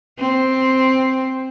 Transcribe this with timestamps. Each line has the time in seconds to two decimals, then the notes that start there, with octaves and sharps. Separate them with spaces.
0.19 C4